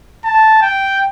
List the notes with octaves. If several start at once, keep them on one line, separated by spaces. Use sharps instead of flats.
A5
G5